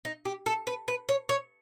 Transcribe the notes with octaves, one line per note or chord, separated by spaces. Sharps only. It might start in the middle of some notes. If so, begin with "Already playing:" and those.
D#4
G4
A4
B4
B4
C#5
C#5